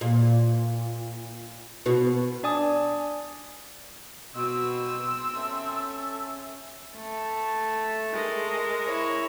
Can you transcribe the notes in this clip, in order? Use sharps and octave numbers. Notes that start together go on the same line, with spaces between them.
A#2
B2 B3 F#4
D4 D5 G#5 D#6
B2 C4 E6
C#4 A4 E5
A3
G#3 A#4
E4 C#5